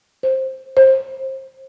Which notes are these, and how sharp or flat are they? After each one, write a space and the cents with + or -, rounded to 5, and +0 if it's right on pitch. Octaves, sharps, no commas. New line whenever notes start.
C5 +10
C5 +25